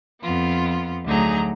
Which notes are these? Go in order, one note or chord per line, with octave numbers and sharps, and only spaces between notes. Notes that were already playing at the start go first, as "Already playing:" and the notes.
F2 B3 F4
D2 F#3 D#4 G#4 A#5